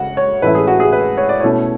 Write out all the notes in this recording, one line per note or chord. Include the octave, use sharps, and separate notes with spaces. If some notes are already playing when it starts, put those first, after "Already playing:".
Already playing: C#3 C#4 F#4 F#5
C#5
A2 E3 A3 C#4 E4 B4
G#4
F#4
G#4
B4
C#5
D5
B2 A3 C#4 E4 C#5